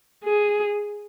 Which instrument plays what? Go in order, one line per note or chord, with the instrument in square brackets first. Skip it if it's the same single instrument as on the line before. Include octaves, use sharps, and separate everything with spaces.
[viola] G#4